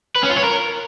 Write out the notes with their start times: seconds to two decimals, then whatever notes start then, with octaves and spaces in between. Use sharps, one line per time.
0.16 B4
0.23 C#4
0.30 F4
0.37 C#5
0.44 A#4